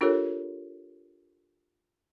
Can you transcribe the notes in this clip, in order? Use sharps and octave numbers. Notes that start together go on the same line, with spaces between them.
D4 F4 G4 A4 A#4 C#5